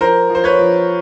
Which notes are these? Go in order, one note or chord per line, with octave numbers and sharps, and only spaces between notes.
F3 A#4 C5
F3
C5
B4 C#5
F3